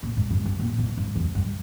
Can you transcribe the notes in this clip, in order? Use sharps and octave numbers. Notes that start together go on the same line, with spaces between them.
A#2
G#2
G2
G2
A#2
B2
G#2
E2
G2